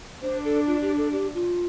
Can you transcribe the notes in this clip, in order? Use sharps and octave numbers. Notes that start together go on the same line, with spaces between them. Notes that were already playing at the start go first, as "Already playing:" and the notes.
D4 C5
A4
F4
G4
A4
G4
F4